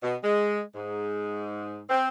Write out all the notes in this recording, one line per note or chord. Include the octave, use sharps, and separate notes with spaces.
B2
G#3
G#2
C4